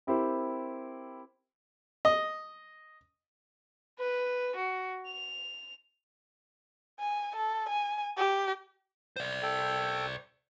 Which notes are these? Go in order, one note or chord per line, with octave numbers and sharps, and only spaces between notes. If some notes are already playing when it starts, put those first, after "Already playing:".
C4 E4 G4 A#4 C5
D#5
B4
F#4
F7
G#5
A4
G#5
G4
C5 D5
A4 G5